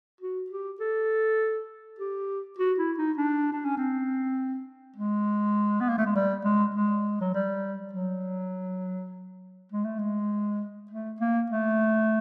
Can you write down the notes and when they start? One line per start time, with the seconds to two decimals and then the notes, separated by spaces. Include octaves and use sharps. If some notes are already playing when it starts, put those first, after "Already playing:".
0.21 F#4
0.50 G4
0.80 A4
1.99 G4
2.58 F#4
2.78 E4
2.98 D#4
3.18 D4
3.52 D4
3.65 C#4
3.78 C4
4.96 G#3
5.80 B3
5.89 A#3
5.98 A3
6.06 G#3
6.15 G3
6.45 G#3
6.75 G#3
7.21 F#3
7.34 G3
7.93 F#3
9.72 G#3
9.85 A3
9.99 G#3
10.91 A3
11.20 A#3
11.50 A3